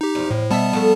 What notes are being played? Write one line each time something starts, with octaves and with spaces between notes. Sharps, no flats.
D#4 G4
E2 F3
A2
B2 G3 B3 E5 A5
F3 A3 A4